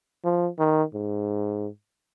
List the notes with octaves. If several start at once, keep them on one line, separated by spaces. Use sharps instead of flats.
F3
D#3
G#2